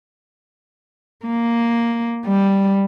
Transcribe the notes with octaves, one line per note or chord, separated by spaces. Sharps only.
A#3
G3